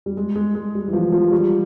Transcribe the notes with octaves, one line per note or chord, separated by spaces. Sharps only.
G3
G#3
G#3
G#3
G3
E3
F3
F3
G3